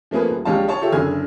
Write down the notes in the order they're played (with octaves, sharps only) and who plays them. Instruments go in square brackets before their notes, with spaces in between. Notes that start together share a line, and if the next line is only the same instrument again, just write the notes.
[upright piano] F3 A3 A#3 G#4 B4
D#1
A#1 G#3 G4 C#5 F5 A5
G#4 C#5 A5
F4 G4 A4 C#5 E5
F#1 D3 E4 G#4 F6 G#6